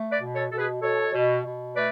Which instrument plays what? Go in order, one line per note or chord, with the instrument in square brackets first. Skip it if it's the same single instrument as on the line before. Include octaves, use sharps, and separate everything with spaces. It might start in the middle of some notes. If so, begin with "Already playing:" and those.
Already playing: [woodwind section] A3
B4 D5
B2
A4 C#5
B2 A4
G#4 B4
B2 A4 C#5
B2
B2
A3 B4 D5